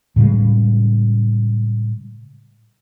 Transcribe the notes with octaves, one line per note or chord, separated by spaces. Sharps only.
A2 C#3 G3 G#3